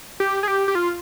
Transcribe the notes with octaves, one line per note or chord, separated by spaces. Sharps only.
G4
G#4
G4
G4
F4